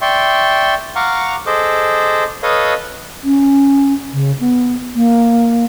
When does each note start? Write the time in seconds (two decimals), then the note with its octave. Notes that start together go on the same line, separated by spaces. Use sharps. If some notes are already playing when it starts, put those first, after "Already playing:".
0.02 D5 E5 G5 C6 C#6
0.96 F5 F#5 A#5 C#6 D6 F6
1.46 G#4 A4 C5 D#5 D6
2.43 A4 B4 C#5 D#5 F5 D#6
3.24 C#4
4.13 C#3
4.40 B3
4.95 A#3